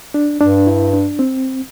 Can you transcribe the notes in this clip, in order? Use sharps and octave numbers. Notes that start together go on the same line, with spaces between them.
D4
G2 D4
E4
D4
C4